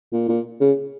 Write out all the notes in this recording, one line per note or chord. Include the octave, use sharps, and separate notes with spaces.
A#2
A#2
C#3